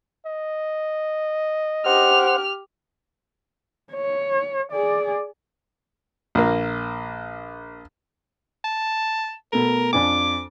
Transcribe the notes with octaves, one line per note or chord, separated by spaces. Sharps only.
D#5
G4 C5 F#5 F6
C#5
G#4 D5
A#1 A#3
A5
B2 A3 A#4
F2 D4 G#5 D6